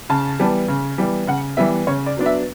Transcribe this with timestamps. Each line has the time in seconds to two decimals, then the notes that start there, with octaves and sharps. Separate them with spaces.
0.09 C#3 A5
0.39 E3 G3 B3
0.68 C#3
0.98 E3 G3 B3
1.27 C#3 F#5
1.57 E3 G3 B3 E5
1.87 C#3 C#5
2.06 D5
2.17 F#3 B3 D4
2.26 E5